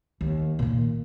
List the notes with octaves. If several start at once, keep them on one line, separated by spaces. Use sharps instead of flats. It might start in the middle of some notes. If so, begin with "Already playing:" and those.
D#2
A#2 D#3